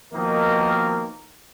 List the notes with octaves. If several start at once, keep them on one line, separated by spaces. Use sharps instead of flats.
B2 D#3 F3 A#3 D#4 A#4